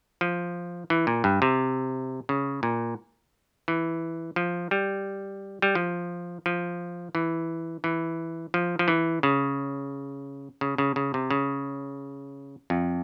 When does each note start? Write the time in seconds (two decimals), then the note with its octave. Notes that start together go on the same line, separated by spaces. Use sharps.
0.21 F3
0.90 E3
1.07 A#2
1.24 G2
1.42 C3
2.29 C#3
2.63 A#2
3.68 E3
4.36 F3
4.71 G3
5.62 G3
5.75 F3
6.46 F3
7.15 E3
7.84 E3
8.54 F3
8.79 F3
8.88 E3
9.23 C#3
10.61 C#3
10.78 C#3
10.96 C#3
11.14 C3
11.30 C#3
12.70 F2